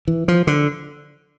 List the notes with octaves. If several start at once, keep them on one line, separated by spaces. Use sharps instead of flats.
E3
F3
D3